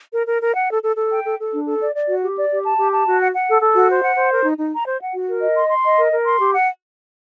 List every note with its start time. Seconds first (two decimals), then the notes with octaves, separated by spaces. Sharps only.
0.13 A#4
0.27 A#4
0.42 A#4
0.55 F#5
0.69 A4
0.83 A4
0.96 A4
1.10 G5
1.25 A4
1.39 A4
1.52 D4
1.66 A4
1.80 D5
1.94 D5
2.08 F#4
2.22 G4
2.37 D5
2.50 G4
2.64 A5
2.78 G4
2.92 A5
3.06 F#4
3.20 F#5
3.33 F#5
3.47 A4
3.61 A4
3.75 F#4
3.89 C5
4.02 F#5
4.16 C5
4.31 A#4
4.44 D#4
4.58 D#4
4.72 A#5
4.86 C5
5.00 F#5
5.14 F#4
5.28 A#4
5.41 D#5
5.55 C6
5.69 C6
5.84 D#5
5.97 A#4
6.12 A#4
6.25 C6
6.39 G4
6.53 F#5